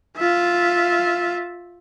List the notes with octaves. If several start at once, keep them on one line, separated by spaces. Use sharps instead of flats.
F4 E5